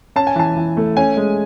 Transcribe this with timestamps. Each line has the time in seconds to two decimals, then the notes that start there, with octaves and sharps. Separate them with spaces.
0.16 C#4 A5
0.27 G#5
0.36 E3 A5
0.56 E3
0.77 A3
0.97 C#4 G#5
1.17 G#3